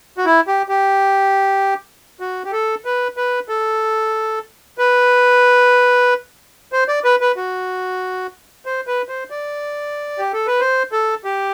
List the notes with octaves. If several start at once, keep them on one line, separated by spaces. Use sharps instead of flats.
F#4
E4
G4
G4
F#4
G4
A4
B4
B4
A4
B4
C5
D5
B4
B4
F#4
C5
B4
C5
D5
G4
A4
B4
C5
A4
G4